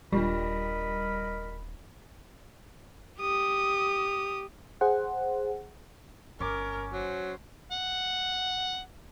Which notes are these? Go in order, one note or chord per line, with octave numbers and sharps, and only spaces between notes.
D#1 G3 D4 F4 G4 A#4 D#5 B5
G4 D#6
G#4 C5 F#5
G1 C#4 A#4 D6
F#3 C5
F#5